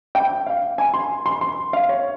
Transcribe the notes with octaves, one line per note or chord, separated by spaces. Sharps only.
G5
F5
G#5
C6
C6
C6
F5
C#5